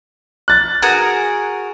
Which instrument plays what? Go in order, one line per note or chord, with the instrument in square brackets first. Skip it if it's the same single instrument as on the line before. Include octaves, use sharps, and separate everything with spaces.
[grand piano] F#6 A6
[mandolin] F#4 G#4 A#4